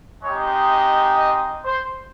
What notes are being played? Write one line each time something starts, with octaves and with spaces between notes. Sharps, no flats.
G#3 C4 D#4 G4 C#5
D#5
D#5
C5